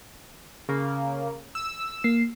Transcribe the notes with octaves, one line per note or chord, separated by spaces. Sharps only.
C#3 A#3
E6
A#3 C7